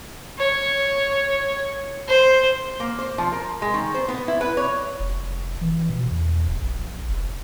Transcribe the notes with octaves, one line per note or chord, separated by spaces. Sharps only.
C#5
C5
A#3
C5
F3
A#4
G#3
D#3
C5
B3
E4
B4
C#5
F1
E3
B2
E2
D1
A#1
F1